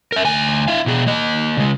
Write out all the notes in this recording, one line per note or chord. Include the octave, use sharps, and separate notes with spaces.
A#4 E5
D2 G#5
E4 F5
B2 G#4
A#3 D#5
C#3 G#3